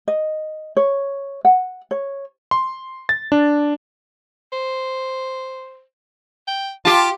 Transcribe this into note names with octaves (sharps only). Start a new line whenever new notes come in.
D#5
C#5
F#5
C#5
C6
A6
D4
C5
G5
F4 G4 A5